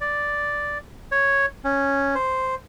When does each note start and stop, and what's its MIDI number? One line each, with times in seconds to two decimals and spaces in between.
0.01 0.78 74
1.12 1.46 73
1.65 2.15 61
2.15 2.55 72